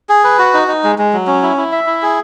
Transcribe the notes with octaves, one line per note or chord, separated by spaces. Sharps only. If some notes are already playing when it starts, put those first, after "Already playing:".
G#4
B4
F#4
D#4
D#4
G#3
G#3
F#3
C#4
E4
E4
E5
E4
G#4